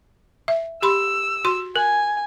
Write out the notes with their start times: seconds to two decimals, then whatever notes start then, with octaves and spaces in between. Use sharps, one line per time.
0.48 E5
0.82 G4 B5 C6 E6
1.45 F#4 C6
1.76 A#4 G#5